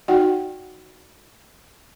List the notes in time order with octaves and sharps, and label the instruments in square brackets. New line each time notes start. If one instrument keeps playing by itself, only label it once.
[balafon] D#4 F#4 D5 F#5 G5